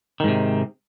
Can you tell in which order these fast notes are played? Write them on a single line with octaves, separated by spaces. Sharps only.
D#3 G#2 C3